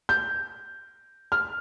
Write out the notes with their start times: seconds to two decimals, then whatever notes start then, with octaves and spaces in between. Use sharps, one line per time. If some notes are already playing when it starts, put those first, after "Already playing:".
0.09 G6
1.32 F6